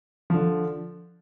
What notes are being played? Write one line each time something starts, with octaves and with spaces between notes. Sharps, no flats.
D3 F3